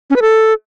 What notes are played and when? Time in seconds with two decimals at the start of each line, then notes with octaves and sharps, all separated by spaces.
0.10 C#4
0.16 B4
0.22 A4